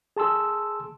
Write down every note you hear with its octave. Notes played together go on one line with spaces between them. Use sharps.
G#4 A5 C6 E6